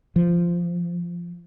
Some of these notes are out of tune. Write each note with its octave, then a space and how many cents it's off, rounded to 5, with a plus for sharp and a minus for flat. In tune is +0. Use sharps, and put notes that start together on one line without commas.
F3 -10